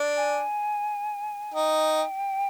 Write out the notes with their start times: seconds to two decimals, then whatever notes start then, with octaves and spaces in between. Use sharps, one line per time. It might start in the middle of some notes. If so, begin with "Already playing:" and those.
Already playing: D4
0.17 G#5
1.54 D#4 G5